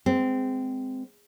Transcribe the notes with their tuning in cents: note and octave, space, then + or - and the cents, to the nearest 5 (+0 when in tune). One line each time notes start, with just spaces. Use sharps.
G#3 -5 C4 -20